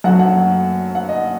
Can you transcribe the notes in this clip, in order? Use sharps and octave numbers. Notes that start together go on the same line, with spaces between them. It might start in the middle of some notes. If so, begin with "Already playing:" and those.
F#2 F#3 A3 F#5
F#5
F#5
D#5